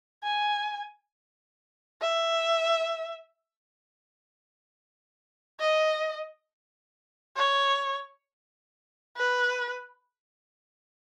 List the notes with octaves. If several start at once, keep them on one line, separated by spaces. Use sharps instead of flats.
G#5
E5
D#5
C#5
B4